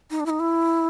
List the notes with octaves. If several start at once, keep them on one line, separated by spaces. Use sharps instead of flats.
D#4
D4
E4
D#4
E4